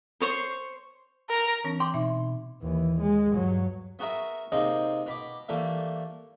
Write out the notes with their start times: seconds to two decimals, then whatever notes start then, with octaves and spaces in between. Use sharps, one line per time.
0.20 C5 C#5 C6
1.30 A#4
1.64 E3 C4 D4
1.80 G5 C6 D6
1.94 B2 D#4 E5
2.62 D#2 E3
3.01 G#3
3.34 G2 F#3
3.99 B3 F#4 G#4 A#4 E5
4.52 C3 A#3 C4 D#4 G#4 D#5
5.06 B2 B5 D6
5.49 E3 G3 A3 A#3